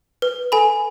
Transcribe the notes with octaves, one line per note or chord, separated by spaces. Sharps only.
B4
A4 G#5 B5